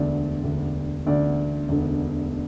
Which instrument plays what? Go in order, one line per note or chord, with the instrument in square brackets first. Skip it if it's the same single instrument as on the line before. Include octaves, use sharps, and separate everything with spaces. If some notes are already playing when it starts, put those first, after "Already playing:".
Already playing: [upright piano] E1 D2 D3 D5
E1 D2 D3
E1 D2 D3 D5
E1 D2 D3